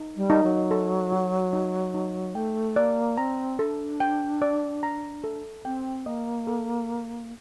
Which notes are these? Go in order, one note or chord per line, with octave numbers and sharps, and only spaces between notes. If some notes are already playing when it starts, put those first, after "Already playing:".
Already playing: D#4
G3
D#4
F#3
A4
F#4
D#4
D#4
A3 G5
A#3 D5
C4 A#5
D4 A4
G5
D5
A#5
A4
C4 G5
A#3 D#5
A4